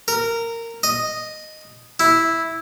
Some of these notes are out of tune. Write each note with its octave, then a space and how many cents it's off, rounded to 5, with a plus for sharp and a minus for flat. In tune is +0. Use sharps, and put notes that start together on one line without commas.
A#4 -15
D#5 -5
E4 -5